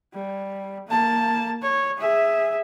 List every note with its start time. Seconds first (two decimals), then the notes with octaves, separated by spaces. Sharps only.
0.14 G3
0.87 A#3 A5
1.62 C#5
1.98 G#4 E5